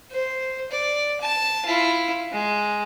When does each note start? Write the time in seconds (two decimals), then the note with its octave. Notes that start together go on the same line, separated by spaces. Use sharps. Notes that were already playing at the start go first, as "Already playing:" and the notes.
0.11 C5
0.71 D5
1.21 A5
1.65 E4 F4
2.32 G#3